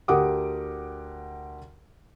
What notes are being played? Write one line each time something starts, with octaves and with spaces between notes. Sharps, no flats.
D2 G4 A#4 F#5 D6 D#6